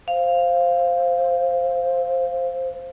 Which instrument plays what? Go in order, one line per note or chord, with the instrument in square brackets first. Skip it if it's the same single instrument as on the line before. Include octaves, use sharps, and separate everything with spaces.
[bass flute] C5 [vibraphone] F5